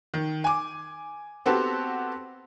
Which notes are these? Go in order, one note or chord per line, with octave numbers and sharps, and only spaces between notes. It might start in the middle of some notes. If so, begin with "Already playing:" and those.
D#3
G#5 D6
B3 C4 F#4 G4 A4